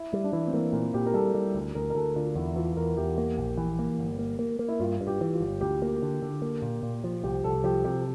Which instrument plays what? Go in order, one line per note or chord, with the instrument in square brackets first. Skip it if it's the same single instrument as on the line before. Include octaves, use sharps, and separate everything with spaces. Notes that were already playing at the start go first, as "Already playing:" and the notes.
Already playing: [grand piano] E4
[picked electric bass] G3 [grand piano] E4
[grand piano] D4
[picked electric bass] E3 [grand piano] E4
[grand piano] C4
[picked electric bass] E3 [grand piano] A#3
[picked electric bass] A#2 [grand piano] A#3
[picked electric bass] A#2 [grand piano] G4
[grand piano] A#4
[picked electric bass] G3 [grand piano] A4
[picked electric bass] G3
D2
[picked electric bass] D2 [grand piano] A#4
[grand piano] A#4
[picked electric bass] D2 [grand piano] A4
[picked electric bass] D3 [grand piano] F4
[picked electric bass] E2 [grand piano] E4
[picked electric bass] E3 [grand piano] F4
[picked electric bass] E2 [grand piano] A#4
[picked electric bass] E2 [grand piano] G4
[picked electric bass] A#3
A#1
E3
A#3
G1
A#3
A#3
A#3
[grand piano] E4
[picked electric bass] G2 [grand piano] F4
[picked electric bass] G2
[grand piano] G4
[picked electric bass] E3
[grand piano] F4
[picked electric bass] G1
[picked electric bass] D2 [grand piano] G4
[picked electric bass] A#3
D3
D3
A#3
A#2
A#2
F3
[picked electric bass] C2 [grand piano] G4
[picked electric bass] C2 [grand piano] A4
[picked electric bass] F3 [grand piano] G4
[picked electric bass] C3 [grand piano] G4